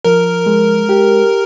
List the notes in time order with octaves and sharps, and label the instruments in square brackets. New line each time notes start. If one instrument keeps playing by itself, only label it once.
[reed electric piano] F3 [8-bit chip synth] A#4
[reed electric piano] G#3
G4